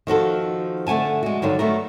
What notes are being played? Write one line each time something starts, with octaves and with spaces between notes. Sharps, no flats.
D#3 F3 F#4 A4
D3 A3 F#5 G#5 A5
G#3 F#4
G2 D3 D#3 F#3
A3 B3 F#4 A#4